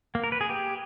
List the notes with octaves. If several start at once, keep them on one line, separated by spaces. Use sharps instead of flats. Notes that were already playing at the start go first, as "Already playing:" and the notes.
A#3
A#4
B4
G#4
G4